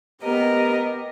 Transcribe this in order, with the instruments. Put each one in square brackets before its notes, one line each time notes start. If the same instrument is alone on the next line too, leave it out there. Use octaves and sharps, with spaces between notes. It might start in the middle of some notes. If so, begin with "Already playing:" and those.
[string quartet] B3 G4 A#4 D#5